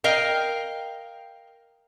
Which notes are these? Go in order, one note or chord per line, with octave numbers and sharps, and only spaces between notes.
A#4 D#5 F5 G5